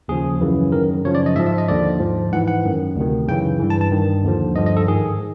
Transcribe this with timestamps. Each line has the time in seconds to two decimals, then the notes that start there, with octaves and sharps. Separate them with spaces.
0.08 D#2 C#3 F3 G#4
0.41 F#2 C#3 E3
0.72 F#2 D#3 A#4
1.05 F#2 C#3 F3 C#5
1.15 D5
1.26 D#5
1.36 G#2 F3 E5
1.47 E5
1.58 D#5
1.68 D#2 D3 F3 D5
2.00 G#2 F3
2.32 G#2 E3 F#5
2.48 F#5
2.64 F#2 D#3
2.96 D2 C3 D#3
3.28 F#2 C#3 E3 G5
3.60 G2 E3
3.70 A5
3.81 A5
3.91 G2 D#3
4.24 D#2 D3 F3
4.55 G2 D3 F3 D#5
4.66 D#5
4.77 A4
4.87 G#2 D#3 G#4